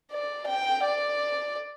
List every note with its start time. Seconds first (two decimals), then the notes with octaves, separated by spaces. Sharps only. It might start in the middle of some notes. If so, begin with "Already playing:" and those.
0.11 D5
0.47 G5
0.83 D5